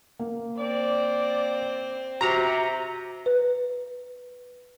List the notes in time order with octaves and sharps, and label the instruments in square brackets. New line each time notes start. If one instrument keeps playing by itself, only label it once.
[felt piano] A#3
[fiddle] C4 [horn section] D5
[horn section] C3 [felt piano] F#4 [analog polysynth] A#5
[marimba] B4